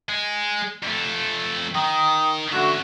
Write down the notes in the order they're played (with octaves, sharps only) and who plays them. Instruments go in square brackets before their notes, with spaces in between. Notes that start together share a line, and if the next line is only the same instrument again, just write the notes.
[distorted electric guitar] G#3
F2 A3
[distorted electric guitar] D#3 [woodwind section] G5 A#5 D#6
[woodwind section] D3 A3 F#4 [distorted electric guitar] C#4 E5